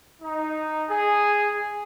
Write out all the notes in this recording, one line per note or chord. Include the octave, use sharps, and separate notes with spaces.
D#4
G#4